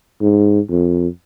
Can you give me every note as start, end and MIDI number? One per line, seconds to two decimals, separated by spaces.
0.21 0.60 44
0.69 1.08 41